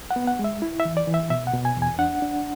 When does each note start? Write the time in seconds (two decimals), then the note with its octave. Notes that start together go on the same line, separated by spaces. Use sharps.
0.11 F#5
0.16 B3
0.27 F#5
0.39 G#3
0.44 E5
0.62 E4
0.80 E5
0.85 E3
0.97 D5
1.07 E3
1.14 E5
1.30 B2 E5
1.47 F#5
1.53 B2
1.65 G#5
1.77 E2
1.82 G#5
1.99 D4 F#5
2.22 D4